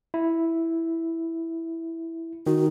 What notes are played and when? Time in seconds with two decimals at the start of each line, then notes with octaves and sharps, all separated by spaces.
0.14 E4
2.47 D#3 F#4